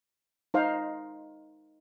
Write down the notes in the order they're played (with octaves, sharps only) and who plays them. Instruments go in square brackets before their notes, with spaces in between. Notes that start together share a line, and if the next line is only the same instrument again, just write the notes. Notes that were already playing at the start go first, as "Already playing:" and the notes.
[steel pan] D#4 C5 F5